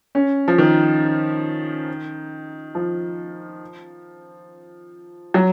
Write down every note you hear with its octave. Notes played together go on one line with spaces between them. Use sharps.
C#4
F3
D#3
F3
F#3